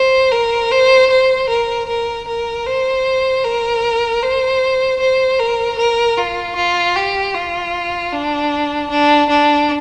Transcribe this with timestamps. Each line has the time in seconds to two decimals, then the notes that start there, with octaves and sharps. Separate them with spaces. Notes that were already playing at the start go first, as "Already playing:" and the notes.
Already playing: C5
0.32 A#4
0.71 C5
1.10 C5
1.49 A#4
1.88 A#4
2.28 A#4
2.66 C5
3.44 A#4
4.22 C5
5.00 C5
5.39 A#4
5.78 A#4
6.17 F4
6.56 F4
6.96 G4
7.34 F4
8.13 D4
8.90 D4
9.29 D4